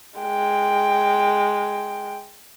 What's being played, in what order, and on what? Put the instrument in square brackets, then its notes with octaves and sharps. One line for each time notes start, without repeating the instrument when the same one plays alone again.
[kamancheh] G#3 G5